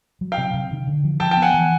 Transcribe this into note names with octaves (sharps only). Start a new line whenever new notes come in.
F#3
F5 G5
C3
C3
D#3
D3
F3
F3 G5 A5
G5 A5
B3
F#5 G#5
E3